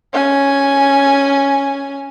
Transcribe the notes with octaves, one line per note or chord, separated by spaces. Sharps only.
C#4 G#5